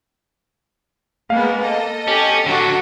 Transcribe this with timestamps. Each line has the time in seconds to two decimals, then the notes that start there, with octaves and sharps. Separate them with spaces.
1.30 G#3 A#3 B3 F5
1.61 A4 D#5
2.08 C#4 G4
2.46 D3 F#3 D4 F#4